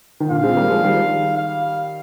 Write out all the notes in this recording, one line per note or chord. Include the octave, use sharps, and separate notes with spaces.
D#3
A#2 D3 F5
G#3 C4
G3 A#3
F3 G#3
D#3 G3
F5